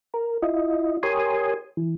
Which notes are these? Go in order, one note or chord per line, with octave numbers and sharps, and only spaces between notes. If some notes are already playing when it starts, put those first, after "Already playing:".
A#4
E4 F4 D#5
G4 A#4 C#5 G#5 C6 D#6
E3